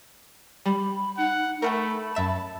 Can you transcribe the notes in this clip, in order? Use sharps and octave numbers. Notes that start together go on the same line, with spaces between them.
G3 B5
D#4 F#5
A3 A#4 F#5 G5 B5
F#2 E5 A5 E7